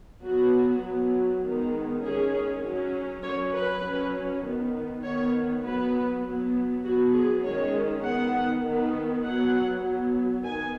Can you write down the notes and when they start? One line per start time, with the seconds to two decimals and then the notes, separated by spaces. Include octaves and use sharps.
0.23 F#3 B3 F#4
0.82 F#3 B3
1.43 D#3 G#3 B3
2.03 D#3 G#3 C#4 G#4
2.63 F#3 C#4
3.23 F#3 C#4 C#5
3.53 B4
3.83 F#3 C#4
4.43 D#3 B3
5.03 D#3 B3 C#5
5.63 F#3 B3 B4
6.24 F#3 B3
6.84 F#3 B3 F#4
7.15 G#4
7.44 D#3 G#3 C#4 C#5
8.04 D#3 B3 F#5
8.64 D#3 B3
9.24 F#3 B3 F#5
9.84 F#3 B3
10.45 D#3 B3 G#5